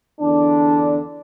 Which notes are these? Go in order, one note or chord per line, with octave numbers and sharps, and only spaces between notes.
E2 D3 D4